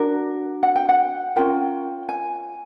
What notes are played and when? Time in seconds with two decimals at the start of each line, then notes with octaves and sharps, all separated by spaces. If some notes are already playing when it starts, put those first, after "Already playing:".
Already playing: D4 F#4 A#4
0.63 F#5
0.76 G5
0.89 F#5
1.36 C#4 F4 A#4 G5
2.09 G#5